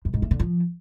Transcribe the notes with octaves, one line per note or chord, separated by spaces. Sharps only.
F#2
G#2
A3
D3
F3